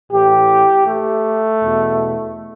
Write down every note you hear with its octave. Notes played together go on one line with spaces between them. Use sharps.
A2 E3 G4
A3
E2 B2